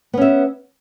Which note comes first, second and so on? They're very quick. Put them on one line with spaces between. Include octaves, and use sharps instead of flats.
B3 C#4 E5